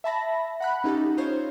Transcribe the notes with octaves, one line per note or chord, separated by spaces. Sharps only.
E5 A5 B5 A#6
F#5 B5 F#6
C#4 D#4 G4 A4
D#4 F4 C5 C#5